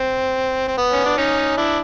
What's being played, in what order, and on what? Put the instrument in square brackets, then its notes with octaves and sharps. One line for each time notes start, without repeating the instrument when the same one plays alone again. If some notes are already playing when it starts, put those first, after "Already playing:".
Already playing: [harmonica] C4
C4
B3
C#4
D4
C#4 D#4
D4 E4